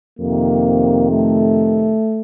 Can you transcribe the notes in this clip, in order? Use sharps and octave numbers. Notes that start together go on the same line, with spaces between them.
F2 C3 D#3 A#3
A3